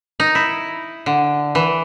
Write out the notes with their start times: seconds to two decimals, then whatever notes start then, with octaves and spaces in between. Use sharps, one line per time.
0.20 D#4
0.35 E4
1.06 D3
1.55 E3